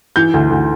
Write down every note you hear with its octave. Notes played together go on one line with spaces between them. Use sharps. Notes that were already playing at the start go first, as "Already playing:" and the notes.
E3 G6
D2
D2